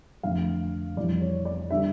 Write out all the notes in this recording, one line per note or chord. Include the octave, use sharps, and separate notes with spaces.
F2 D3 A3 F5
F2 E3 G3 D5
C#5
D5
D3 G3 E5